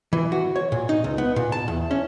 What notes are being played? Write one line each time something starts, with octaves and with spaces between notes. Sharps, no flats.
E3
F#4
C#5
A#2
D#4
C#2
B3
A#2
A5
E2
C#4